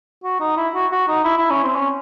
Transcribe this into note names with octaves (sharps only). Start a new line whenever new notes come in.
F#4
D#4
E4
F#4
F#4
D#4
E4
E4
C#4
C4
C#4